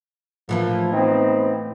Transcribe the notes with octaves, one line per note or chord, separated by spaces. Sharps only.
A#1 A2 E3 F3 A#3
B3 C4 D#4